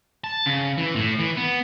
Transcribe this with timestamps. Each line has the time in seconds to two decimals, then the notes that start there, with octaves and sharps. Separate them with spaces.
0.24 A5
0.46 C#3
0.78 E3
0.96 A2
1.19 E3
1.37 B3